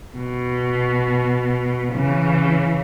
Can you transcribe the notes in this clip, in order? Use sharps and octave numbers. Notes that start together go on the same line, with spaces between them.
B2
C#3 E3